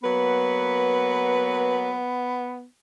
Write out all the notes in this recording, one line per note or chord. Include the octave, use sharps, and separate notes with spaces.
F#3 A#3 B3 B4